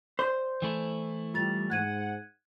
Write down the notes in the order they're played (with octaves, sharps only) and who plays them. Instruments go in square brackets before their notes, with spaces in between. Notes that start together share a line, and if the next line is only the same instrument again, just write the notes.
[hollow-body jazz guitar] C5 [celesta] D5
[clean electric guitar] E3 A3 E4
[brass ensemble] G3 [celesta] F4 A6 F7
[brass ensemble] G#2 F#5 [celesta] F#6 G#6 D#7